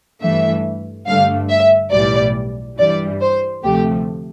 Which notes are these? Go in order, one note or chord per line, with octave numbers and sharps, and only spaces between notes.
G2 E3 A3 E5
G2 D3 A3 F5
E5
B1 A2 E3 G3 D5
G2 E3 G3 D5
C5
D2 C3 F3 A3 G4